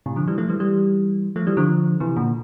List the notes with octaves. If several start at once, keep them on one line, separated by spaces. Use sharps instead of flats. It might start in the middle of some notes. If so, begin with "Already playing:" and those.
A2 C3
D3 F3
E3 G3
F3 A3
E3 G3
E3 G3
F3 A3
E3 G3
D3 F3
C3 E3
A#2 D3